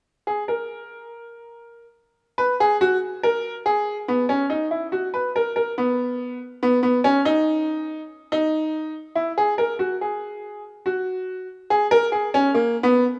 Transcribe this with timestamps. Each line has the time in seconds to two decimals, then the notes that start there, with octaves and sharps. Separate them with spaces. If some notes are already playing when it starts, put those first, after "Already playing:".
0.27 G#4
0.48 A#4
2.38 B4
2.60 G#4
2.81 F#4
3.23 A#4
3.66 G#4
4.08 B3
4.29 C#4
4.50 D#4
4.71 E4
4.92 F#4
5.14 B4
5.36 A#4
5.56 A#4
5.78 B3
6.63 B3
6.83 B3
7.04 C#4
7.25 D#4
8.32 D#4
9.15 E4
9.38 G#4
9.58 A#4
9.79 F#4
10.01 G#4
10.86 F#4
11.70 G#4
11.91 A#4
12.12 G#4
12.34 C#4
12.54 A#3
12.83 B3